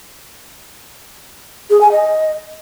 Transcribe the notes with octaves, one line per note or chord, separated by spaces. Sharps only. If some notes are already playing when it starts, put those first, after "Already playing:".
G#4
G#5
D#5